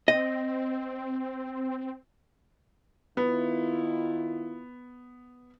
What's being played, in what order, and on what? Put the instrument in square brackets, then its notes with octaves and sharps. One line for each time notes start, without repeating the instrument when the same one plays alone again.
[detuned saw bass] C4 [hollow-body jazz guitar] D#5
[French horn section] D#3 E4 F4 [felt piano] B3